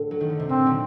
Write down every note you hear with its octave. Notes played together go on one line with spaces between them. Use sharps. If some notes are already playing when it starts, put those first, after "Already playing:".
Already playing: A2 D3
F#3
D#3
D3
C3
A#2 C4
D3 F#3